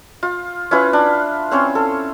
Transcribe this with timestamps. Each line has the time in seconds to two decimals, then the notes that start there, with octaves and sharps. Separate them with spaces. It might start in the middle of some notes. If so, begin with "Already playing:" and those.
0.23 F4
0.71 C#4 E4 F4 B4
0.93 D4
1.51 C4 C#4 C#5 C6
1.75 A4